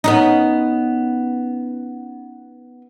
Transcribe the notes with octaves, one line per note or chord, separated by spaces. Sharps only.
B3 C#4 D#4